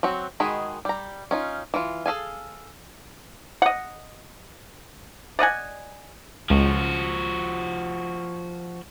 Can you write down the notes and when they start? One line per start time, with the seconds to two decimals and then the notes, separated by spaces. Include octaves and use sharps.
0.03 F#3 C4 F#4
0.40 D#3 G#3 F#4 G#4 B5
0.85 G3 A#5
1.31 C#4 D#4 F4
1.74 E3 F4
2.06 G#4 A4 F5 G#5
3.62 D#5 F#5
5.39 D5 D#5 F#5 G#5
6.50 C#2 F3 F#4